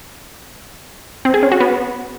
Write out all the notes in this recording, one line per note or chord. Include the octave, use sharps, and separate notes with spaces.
C4
G#4
C#4
F#4
B3